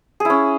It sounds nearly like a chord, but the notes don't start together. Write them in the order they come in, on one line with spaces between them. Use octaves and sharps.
G#4 E4 C#4